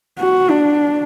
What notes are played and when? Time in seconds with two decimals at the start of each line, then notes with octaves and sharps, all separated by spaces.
0.19 F#4
0.50 D4